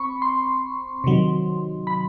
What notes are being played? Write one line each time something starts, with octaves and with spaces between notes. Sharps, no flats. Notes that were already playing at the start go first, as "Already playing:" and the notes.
Already playing: C4 B5 C#6
C6
C3 D#3 F#3
B5